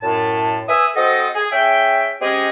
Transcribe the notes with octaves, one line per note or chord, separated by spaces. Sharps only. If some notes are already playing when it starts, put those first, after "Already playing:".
F#2 A2 A5
B4 E5 G#5 D#6 E6
C4 F#4 A4 C5 D#5
G#4
C#4 G#4 E5 G5
G#3 C4 C#4 G4 G#4 D#5